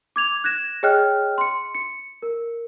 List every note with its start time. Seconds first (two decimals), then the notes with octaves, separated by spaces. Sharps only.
0.16 D6 G#6 F7
0.44 F#6 G#6 A#6 E7
0.83 G#4 C#5 D#5 G5 F6 F#6
1.38 C6 C#7
1.75 C#7
2.22 A#4